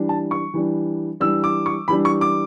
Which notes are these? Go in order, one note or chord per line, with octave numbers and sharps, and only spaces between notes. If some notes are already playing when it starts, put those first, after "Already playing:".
Already playing: E3 G3 D4
A5
C#6
E3 G3 D4
E3 G3 D4 E6
D6
C#6
E3 G3 D4 B5
C#6
D6